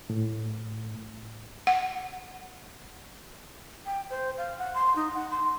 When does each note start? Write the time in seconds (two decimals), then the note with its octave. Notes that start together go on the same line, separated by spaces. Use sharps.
0.10 A2
1.67 F#5
3.86 G5
4.10 C5
4.37 F5
4.58 F#5
4.74 C6
4.96 D#4
5.14 F#5
5.31 C6